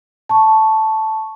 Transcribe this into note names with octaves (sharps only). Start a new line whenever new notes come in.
A5 C#6